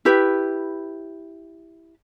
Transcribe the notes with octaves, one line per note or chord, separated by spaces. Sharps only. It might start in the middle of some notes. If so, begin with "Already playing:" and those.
E4 G4 B4